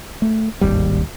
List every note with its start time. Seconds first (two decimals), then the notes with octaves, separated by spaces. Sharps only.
0.22 A3
0.61 D1 G#1 D#2 G3